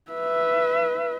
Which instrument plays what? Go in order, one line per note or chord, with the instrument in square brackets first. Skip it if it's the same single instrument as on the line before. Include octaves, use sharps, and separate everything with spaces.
[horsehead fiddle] B4 E5